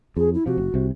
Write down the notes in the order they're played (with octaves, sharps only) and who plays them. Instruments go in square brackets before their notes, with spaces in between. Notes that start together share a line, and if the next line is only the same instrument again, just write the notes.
[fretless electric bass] F2 [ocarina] G#4
[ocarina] E4
[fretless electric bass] C3 F3 [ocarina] F#4
[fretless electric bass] F#1
C2 C3